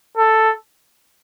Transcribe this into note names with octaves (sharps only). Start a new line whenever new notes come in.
A4